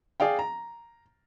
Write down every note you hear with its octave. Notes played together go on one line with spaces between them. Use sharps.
G#4 D5 F5 G5
A#5